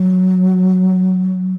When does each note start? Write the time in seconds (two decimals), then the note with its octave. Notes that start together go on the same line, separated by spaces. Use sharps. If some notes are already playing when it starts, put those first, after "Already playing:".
Already playing: F#3